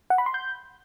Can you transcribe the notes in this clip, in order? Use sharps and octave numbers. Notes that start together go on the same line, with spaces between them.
F#5
B5
C6
G6